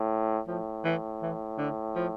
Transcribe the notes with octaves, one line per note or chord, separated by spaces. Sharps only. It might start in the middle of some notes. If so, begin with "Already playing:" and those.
Already playing: A2
A2 F3
E3
E3
D3
F3